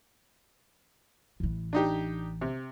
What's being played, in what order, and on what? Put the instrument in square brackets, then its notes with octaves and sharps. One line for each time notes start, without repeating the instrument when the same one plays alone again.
[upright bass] A1 E3
[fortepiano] D4 D#4 G4
C3